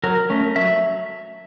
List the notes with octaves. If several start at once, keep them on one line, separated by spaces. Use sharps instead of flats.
F#3 A#4
A3 C#4
F#3 E5